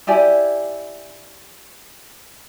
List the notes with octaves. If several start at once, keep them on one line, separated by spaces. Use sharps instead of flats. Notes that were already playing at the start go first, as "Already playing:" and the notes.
E4 G4 D5 G#5